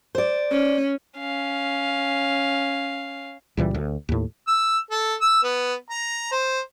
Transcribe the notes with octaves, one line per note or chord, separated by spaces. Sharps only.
C5 D5
C#4
C#4 F5
C#2 A#2 E3 G3
D2
D#2 A2
E6
A4
E6
B3
A#5
C5